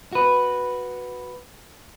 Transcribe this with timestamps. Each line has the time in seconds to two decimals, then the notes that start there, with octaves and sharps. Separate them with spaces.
0.13 F#4 B4